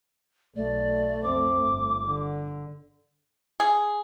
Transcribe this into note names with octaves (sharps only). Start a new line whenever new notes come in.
B1 A3 D5
F2 C4 D6
G1
D3
G#4